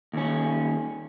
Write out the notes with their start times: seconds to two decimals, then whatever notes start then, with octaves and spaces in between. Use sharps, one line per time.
0.13 D#2 C#4